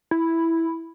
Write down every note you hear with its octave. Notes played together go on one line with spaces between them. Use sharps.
E4